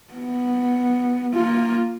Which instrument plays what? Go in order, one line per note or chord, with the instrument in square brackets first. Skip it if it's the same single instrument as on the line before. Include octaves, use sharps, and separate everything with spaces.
[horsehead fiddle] B3
A#3 F4